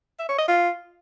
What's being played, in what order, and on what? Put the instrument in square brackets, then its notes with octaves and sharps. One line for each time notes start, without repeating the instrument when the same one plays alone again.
[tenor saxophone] E5
C#5
D#5
F4